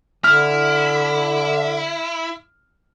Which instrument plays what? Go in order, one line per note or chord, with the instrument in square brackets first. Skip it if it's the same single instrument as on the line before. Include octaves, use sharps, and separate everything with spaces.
[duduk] D3 [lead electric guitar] E4 [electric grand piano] F6